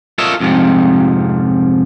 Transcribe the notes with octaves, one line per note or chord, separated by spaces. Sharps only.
F4 A4 A#4 C#5 D#5 E5
F2 G#2 C3 F3